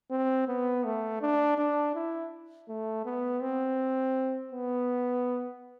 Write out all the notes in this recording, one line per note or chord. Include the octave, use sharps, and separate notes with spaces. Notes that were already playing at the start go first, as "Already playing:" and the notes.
C4
B3
A3
D4
D4
E4
A3
B3
C4
B3